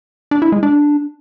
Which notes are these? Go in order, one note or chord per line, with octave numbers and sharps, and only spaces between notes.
D4
E4
G#3
D4